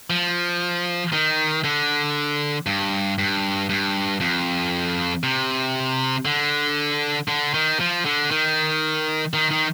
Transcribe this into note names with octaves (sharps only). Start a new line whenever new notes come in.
F3
D#3
D3
G2
G2
G2
F2
C3
D3
D3
D#3
F3
D3
D#3
D#3
D#3